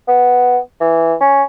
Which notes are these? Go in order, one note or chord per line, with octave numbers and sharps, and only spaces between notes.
B3
E3
C#4